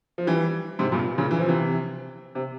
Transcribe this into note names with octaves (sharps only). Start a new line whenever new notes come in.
F3
E3 G3
G#2 C3
G2 A#2
A#2 C#3
E3
F3
C3 E3
C3